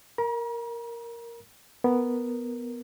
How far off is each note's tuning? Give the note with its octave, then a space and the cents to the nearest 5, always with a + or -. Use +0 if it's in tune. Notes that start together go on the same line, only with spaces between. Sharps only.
A#4 +0 A#5 +45
B3 +0 A#4 +0